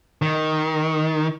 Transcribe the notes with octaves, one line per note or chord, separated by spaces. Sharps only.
D#3